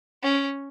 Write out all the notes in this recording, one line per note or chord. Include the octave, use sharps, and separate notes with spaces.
C#4